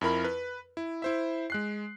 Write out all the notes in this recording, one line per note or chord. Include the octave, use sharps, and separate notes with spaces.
F2 E4 A#4 B5
B4
E4
E4 C5 E5
G#3 F#6 C7